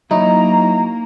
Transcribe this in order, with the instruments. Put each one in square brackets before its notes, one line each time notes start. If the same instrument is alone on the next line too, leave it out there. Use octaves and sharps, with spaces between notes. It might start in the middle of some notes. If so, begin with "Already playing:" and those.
[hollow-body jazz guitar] F#3 [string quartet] A#3 [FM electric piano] D#4 E4 [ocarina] A#5